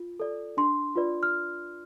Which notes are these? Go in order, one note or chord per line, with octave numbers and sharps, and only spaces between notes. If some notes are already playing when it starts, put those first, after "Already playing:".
Already playing: F4
A4 D5
D4 C6
F4 B4 D5
F6